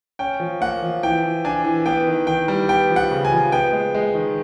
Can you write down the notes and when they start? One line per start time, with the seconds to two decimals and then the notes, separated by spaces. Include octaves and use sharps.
0.19 C#4 G5
0.40 F3
0.61 A#3 F#5
0.82 F3
1.03 E3 G5
1.24 E3
1.45 D4 G#5
1.65 E3
1.86 B3 G5
2.07 D#3
2.27 D#3 G5
2.48 G3
2.69 B3 G5
2.90 F3
2.96 F#5
3.11 C#3
3.25 G#5
3.32 F3
3.52 B3 G5
3.73 G#3
3.95 G#3
4.14 D#3